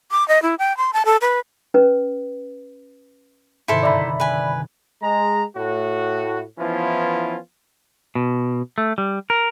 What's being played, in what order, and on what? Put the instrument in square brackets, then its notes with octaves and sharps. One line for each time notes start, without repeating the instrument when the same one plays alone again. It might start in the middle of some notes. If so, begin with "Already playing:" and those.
[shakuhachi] D6
D#5
E4
G5
C6
A5
A4
B4
[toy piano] C#4 B4
[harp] G#2 C3 D#3 [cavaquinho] E4 A4 C5
[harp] G1 A#5 [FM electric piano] D5 E5 B5
[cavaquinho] B4 G#5
[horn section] G#3 A#5
A2 F#4
E3 F3 B3 C#4 E4 F4
[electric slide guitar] B2
A3
G3
A#4